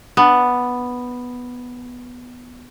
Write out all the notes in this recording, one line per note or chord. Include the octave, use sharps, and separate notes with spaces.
B3 D4